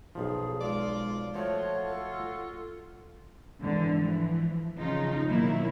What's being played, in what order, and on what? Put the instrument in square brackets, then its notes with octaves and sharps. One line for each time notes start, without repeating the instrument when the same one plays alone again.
[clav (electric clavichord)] B1 F3 [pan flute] G#4
[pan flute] G#3 [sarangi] F4 [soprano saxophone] D5
[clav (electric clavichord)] F3 A3 [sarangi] F4 [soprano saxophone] F#4 [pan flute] C#5
[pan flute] A4
[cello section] G#2 D3 E3
E3 F3
C#3 F3 D#4 F4
B2 D#3 F#3 A#3 E4